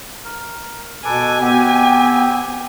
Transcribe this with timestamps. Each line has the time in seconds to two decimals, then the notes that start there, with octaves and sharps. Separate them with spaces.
0.24 A#4
1.05 B2 A4 B4 G#5 D6
1.41 B3 C4 G4